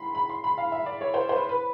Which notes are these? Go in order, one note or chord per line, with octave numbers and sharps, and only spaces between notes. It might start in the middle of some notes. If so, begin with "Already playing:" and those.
Already playing: B5 C6
B5
C6
B5
F5
E5
D5
C#5
C5
C5
B4
B4